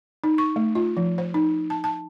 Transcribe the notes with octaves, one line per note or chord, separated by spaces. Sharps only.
D#4
C#6
A3
F4
F3
C5
D#4
A5
A5